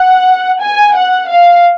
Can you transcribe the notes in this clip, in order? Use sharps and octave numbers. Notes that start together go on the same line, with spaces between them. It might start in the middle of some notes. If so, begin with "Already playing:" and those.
Already playing: F#5
G#5
F#5
F5